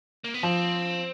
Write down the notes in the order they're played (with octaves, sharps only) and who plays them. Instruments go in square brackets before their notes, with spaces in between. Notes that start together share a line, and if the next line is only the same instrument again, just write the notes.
[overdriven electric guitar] A#3
B3
[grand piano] F3 [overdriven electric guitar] C4